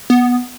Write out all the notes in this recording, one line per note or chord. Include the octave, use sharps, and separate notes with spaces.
B3